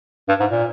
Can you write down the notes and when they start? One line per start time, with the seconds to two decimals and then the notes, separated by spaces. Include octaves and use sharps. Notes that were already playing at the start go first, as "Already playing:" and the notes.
0.29 G2
0.40 G#2
0.51 A#2